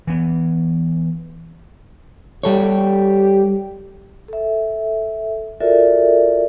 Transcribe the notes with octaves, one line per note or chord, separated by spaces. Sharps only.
E3 B3
G3 G4 A4 C#5
A4 E5
F4 F#4 A4 A#4 D5 E5